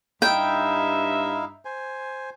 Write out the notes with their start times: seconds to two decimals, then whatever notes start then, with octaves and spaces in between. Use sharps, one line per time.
0.22 G2 D#4 E4 E5 F5 G5
1.65 C5 G#5